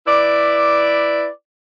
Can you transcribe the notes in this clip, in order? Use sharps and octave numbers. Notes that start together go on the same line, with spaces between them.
E4 B4 D5